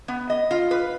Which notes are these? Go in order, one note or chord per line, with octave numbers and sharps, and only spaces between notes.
B3
D#5
F4
B4